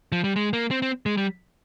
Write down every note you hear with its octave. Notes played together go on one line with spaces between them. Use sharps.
F3
G3
G#3
A#3
C4
C4
G#3
G3